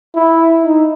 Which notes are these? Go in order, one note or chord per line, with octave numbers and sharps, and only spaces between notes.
E4
D#4